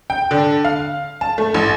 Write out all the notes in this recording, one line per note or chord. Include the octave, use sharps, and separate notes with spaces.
G5
D3
F5
A5
A3
A1